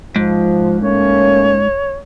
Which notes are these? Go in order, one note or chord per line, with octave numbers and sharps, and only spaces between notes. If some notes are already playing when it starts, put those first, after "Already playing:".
G#2 F3
A3 A#3 C#4 C#5